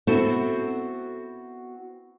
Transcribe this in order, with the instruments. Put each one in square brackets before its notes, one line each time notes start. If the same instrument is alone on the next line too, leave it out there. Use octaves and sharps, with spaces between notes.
[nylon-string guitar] B3 C4 E4 F#4 A4 C5